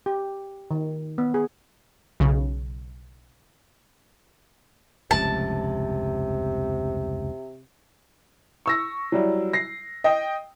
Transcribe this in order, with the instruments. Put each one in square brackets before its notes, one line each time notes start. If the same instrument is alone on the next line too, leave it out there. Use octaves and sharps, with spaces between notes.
[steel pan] G4
D#3
B3
G#4
[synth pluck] B1 C#3
[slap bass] F1 C#2 G2 [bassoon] C3 [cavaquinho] A5
[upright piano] C#6 E6 A#6
F#3 G3 E4
A#6 C7
D#5 G5